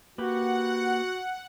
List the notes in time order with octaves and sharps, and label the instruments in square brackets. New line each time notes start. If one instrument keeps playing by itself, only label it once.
[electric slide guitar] A#3 G4 B4 [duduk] F#4 [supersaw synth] F#5